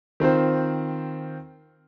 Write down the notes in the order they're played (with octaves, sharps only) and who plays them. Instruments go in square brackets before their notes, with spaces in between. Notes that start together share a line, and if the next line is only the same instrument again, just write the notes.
[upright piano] D#3 C4 F4 C5